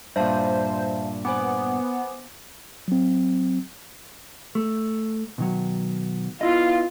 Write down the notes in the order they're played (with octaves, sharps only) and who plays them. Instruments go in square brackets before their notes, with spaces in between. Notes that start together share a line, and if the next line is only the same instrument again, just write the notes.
[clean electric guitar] G2 A#2 [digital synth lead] C5 [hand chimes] E5 F5 A5
[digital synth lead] B3 [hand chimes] C5 G#5 D6
[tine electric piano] F#3 C4
[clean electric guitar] A3
B2 D#3 F#3
[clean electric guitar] B3 E4 D#5 [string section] F4